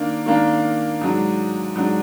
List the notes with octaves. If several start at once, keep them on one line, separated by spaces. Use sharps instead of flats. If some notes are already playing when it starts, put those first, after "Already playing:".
Already playing: D#3 A#3 D4
D#3 A#3 D4
G#2 F#3 D4
G#2 F#3 D4